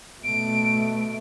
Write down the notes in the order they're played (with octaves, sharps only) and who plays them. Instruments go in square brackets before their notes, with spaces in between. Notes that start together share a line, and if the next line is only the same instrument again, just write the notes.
[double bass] B2 A3 [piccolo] D7